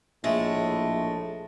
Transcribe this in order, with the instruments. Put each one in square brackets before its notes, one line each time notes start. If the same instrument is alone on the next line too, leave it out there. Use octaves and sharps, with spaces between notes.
[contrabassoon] A#1 [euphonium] A2 [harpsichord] G#3 [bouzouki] A3